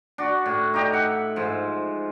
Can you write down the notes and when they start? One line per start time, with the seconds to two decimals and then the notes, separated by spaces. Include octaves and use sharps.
0.18 D4 F#4
0.46 A2
0.74 D#4 G4 D#5
0.93 E5 F#5
1.36 G#2 F3